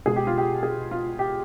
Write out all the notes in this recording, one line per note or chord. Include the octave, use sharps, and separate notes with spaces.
B2 G#3 G#4
G4
F4
G4
G#4
F4
G4